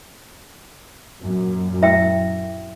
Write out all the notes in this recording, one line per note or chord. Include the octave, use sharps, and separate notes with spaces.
F#2 A#2 F#3
E4 E5 G5